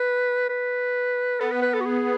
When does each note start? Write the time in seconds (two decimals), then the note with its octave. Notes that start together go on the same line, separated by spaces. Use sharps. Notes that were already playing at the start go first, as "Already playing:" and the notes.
Already playing: B4
0.49 B4
1.40 B3 A4
1.52 B4
1.62 B4
1.74 A4
1.81 F#4
1.86 G#4